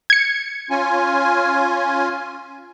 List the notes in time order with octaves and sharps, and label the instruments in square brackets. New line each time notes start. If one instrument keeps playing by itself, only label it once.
[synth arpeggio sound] G#6 C#7
[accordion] C#4 F4 G#5